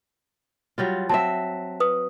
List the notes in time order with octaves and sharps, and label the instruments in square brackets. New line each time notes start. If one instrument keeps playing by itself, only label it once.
[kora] F#3 G3 F4
[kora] F#3 C4 E5 [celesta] A5
[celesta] B4 D#6